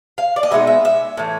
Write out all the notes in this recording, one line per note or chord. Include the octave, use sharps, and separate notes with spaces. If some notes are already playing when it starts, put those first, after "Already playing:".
F5
D5
D#5
B2 G#3 B3 D#4 E5
E5
E5
A2 E3